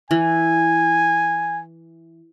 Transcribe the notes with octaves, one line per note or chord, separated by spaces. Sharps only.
E3 G#5